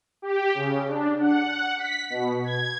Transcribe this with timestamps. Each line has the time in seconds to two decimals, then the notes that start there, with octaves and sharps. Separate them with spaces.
0.22 G4
0.55 C#3
0.88 D4
1.21 F#5
1.78 B6
2.10 B2
2.44 G#6